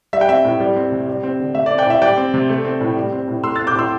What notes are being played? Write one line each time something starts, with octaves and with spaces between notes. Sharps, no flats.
G3 E5
G5
C4 E5
A2
G3
C4
C3
G3
C4
D3
A3 E5
D5
C4
D5 G5
A2 E5
G3 D5 G5
C4
C3
A3
C4
A2
G3
C4
A2
A3 C6 E6
E6 A6
C4
D6 G6
A2 C6 E6